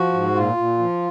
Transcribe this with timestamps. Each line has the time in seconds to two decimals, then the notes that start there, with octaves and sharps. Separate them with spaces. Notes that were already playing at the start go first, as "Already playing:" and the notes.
Already playing: F3 F#4
0.13 G#2
0.35 A#2 F4
0.57 A#2
0.79 F3